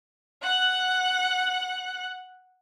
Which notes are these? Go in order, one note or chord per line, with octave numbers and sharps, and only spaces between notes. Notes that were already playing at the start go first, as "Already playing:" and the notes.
F#5 F#6